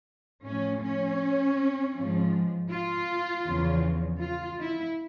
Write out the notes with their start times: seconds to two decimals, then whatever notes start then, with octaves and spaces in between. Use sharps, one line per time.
0.46 A2 F3 C#4
0.84 C#4
1.97 G#2 F3
2.71 F4
3.45 E2 C#3 F3
4.20 F4
4.59 E4